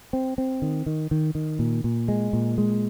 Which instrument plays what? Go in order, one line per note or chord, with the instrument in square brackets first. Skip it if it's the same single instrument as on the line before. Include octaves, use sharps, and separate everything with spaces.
[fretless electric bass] C4
C4
D#3
D#3
D#3
D#3
A#2
A#2
G#3
A#2
G#3